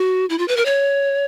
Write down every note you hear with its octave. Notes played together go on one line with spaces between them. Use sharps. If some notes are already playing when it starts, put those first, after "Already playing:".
Already playing: F#4
E4
F4
B4
A#4
C#5